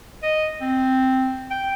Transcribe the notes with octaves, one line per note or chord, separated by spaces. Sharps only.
D#5
C4
G5